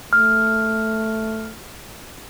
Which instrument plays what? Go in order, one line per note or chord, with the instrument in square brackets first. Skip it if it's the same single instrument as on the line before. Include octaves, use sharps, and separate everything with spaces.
[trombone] A3 [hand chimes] F6